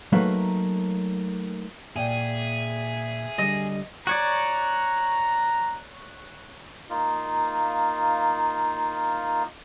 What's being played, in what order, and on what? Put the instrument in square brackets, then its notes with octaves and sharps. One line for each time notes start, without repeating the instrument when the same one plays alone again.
[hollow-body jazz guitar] F#3 A3 A#3 D#4 B4 F5
[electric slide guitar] A#2 D5 G5 [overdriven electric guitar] G#4 [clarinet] E5
[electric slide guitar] D3 G3 [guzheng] D#5
[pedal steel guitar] F#4 C#5 D5 [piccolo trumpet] A#5
[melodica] A#3 D#4 F4